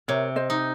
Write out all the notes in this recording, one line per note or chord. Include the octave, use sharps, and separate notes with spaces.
C3 A#4 C#5
C5 D#5
D#4